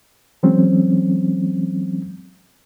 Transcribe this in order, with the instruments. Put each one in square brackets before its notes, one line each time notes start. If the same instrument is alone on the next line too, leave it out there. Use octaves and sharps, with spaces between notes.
[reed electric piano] E3 F#3 G#3 C4 C#4